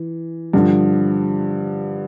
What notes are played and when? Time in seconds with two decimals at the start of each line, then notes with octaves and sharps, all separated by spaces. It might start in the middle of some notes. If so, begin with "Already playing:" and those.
Already playing: E3
0.53 G2 D3 F3